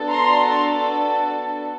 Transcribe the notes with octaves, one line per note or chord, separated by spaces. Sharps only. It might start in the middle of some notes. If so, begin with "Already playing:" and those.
Already playing: B3 D4 F#4 A4
A#5 C6